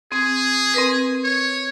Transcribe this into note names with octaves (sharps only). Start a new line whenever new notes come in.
C4 G#4
C4 A#4 B4
C#5